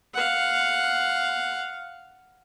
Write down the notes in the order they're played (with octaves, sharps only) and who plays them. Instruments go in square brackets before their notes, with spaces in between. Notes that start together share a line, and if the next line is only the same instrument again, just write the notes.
[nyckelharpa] F5 F#5